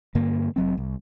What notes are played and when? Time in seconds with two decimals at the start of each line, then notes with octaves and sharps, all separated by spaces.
0.15 G2 D3 A#3
0.56 F1 F#3 C4
0.78 C2